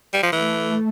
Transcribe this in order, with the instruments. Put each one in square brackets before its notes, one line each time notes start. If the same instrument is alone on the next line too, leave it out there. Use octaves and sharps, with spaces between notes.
[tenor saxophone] G3
F3
[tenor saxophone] E3 [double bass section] A3